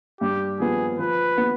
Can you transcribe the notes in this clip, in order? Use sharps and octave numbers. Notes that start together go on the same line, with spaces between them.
G2 G4
F3 B3 G#4
F3 B4
B3